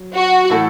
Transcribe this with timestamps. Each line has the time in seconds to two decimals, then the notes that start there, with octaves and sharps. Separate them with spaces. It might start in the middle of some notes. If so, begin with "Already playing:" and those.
Already playing: F#3
0.13 F#4
0.50 A2 E3 A3 E4 A4